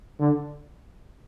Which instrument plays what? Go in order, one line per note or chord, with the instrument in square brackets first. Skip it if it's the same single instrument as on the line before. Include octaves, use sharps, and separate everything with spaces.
[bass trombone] D3